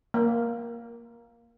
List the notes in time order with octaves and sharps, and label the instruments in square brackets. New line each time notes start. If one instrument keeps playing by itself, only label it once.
[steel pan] A#3